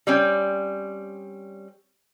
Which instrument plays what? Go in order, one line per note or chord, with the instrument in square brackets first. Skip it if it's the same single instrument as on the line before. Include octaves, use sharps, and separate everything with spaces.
[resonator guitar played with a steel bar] G3 C4 C#4